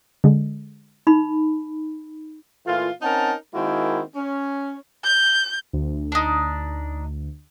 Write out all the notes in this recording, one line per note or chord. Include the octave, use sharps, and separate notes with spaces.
D3 G#3
D#4 B5
A#2 E3 A3 F4
C4 C#4 D#4 A#4 F#5 A5
D#3 G#3 A#3 C4 E4 F#4
C#4
G6
D2
D4 D#4